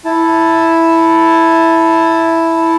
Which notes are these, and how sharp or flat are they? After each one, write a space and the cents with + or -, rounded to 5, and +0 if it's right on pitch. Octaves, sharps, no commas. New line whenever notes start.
E4 +0 A5 +0